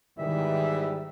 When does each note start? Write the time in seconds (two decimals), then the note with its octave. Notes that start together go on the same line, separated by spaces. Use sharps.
0.18 G#2 D#3 E3 G3 E5